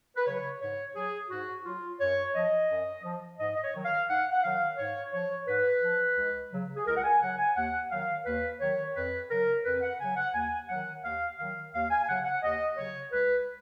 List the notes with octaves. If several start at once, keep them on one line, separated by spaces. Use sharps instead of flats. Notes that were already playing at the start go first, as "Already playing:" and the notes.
B4
C#3 F#3 C#5
G#2 C#5
F#3 G#4
G#2 F#4
F#3 F4
F#2 C#5
F3 D#5
F#2
F3
G#2 D#5
D#5
C#5
D#3 F#3
F5
G#2 F#5
F#5
D#3 F#3 F5
G#2 C#5
F3 C#5
G#2 B4
F3
C#2
C#3 F#3
G#4
C#2 A#4
F#5
G#5
C#3 F#3 F#5
G#5
D#2 F#5
D#3 F#3 F5
D#2 B4
D#3 F#3 C#5
F2 B4
C#3 F#3 A#4
F2 B4
F#5
C#3 F#3 G#5
F#5
D#2 G#5
D#3 F#3 F#5
D#2 F5
D#3 F#3 F5
D#2 F5
G#5
G#5
C#3 F#3 F#5
F#5
D#2 D#5
C#3 F#3 C#5
C#2 B4